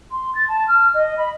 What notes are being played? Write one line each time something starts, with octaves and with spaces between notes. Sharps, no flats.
C6
A6
A5
F6
D#5
B5